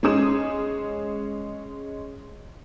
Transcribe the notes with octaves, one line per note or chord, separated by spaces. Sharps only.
G#3 C#4 G#4 D#6 E7